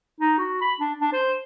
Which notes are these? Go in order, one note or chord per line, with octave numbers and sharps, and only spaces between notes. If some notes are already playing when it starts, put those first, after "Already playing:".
D#4
F#4
B5
D4
D4
C5